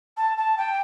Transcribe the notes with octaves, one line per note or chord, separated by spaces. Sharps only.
A5
A5
G5